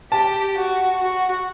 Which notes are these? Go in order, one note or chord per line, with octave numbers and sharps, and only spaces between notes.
G4 A5
F#4
F#4